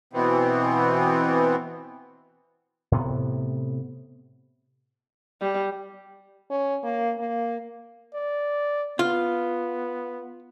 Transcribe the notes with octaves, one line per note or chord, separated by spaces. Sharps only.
B2 E3 B3 C4
A2 C3 B3
G3
C#4
A#3
A#3
D5
B3 F4